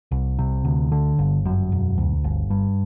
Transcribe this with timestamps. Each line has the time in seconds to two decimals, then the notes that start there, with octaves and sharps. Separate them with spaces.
0.11 C2
0.39 C3
0.65 D2
0.92 D3
1.19 G1
1.45 F#2
1.72 E1
1.98 D2
2.24 G1
2.50 G2